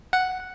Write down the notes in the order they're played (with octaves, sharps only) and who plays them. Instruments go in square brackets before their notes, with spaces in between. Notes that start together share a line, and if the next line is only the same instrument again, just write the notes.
[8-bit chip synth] F#5